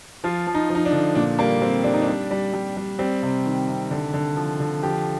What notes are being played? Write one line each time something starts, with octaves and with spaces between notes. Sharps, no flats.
F3 F4
F3
D#4
F3
D#4
D4
D3
A#2 D4
G3 A#3
G3 C4
G3 D4
D#4
D4
G3
G3
G3
G3
G3 C4
C3
D#3
C3
D3
D3
F3
D3
F3 G4